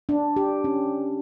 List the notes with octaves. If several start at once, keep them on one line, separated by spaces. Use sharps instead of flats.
D4
G4
C#4